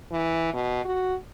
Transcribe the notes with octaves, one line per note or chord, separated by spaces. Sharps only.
E3
B2
F#4